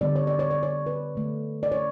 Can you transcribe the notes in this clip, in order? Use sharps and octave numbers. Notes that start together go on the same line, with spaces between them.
D3 G3 B3 D5
C#5
D5
C#5
D5
C#5
B4
D3 A3
D5
C#5